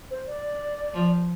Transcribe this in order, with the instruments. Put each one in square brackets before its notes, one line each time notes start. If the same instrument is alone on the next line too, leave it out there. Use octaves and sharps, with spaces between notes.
[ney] C5
D5
[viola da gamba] F3